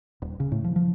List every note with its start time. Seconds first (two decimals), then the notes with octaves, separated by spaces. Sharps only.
0.22 D#1
0.40 C#3
0.52 A2
0.64 F3
0.76 F3